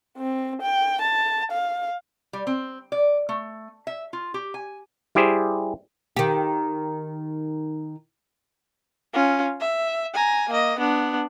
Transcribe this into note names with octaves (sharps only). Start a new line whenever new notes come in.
C4
G5
A5
F5
G3
C4
D5
A3
E5
F4
G4
G#5
G3 E4 G4 G#4 C5
D#3 G4
C#4 F4
E5
G#5 A#5
A#3 D#5
B3 D4